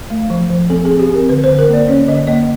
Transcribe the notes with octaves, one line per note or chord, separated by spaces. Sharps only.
A3
F3
F3
C4 A4
G#4
C4
G4
C4 A#4
D3 B4
C5
D3
A#4
A#3 D5
C#4 C#5
D3 D#5
A#3 D#5